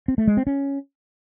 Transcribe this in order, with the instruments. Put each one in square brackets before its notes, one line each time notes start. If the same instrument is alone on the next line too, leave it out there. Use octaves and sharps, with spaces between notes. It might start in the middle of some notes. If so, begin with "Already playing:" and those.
[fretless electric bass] C4
A3
G#3
C4
C#4